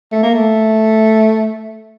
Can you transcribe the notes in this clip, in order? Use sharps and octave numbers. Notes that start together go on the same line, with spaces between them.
A3
A#3
A3